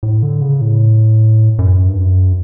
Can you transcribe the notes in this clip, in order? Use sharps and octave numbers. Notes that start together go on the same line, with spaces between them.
A2
D3
C#3
A2
F#2
G2
F#2